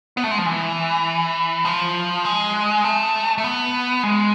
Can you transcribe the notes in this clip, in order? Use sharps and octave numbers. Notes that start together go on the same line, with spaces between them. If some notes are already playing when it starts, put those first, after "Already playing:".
B3
A3
G#3
F3
E3
F3
G#3
A3
A3
B3
G#3